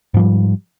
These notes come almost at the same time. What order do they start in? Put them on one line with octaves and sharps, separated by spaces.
G#2 F3 G3